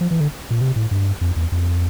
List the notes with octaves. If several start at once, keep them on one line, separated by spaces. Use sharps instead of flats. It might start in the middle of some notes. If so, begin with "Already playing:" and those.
F3
E3
D3
A#2
C3
A2
G2
F2
E2
F2